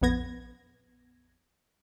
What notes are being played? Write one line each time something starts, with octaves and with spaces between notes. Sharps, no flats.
A#1 F2 B3 G#6 A#6